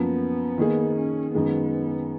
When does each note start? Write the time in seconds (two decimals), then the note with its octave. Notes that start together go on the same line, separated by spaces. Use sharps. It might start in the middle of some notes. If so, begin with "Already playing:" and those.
Already playing: F#2 F3 A#3 B3
0.58 D#3 A#3 D#4 G#4
0.96 C#4
1.34 F#2 D#3 G#3 B3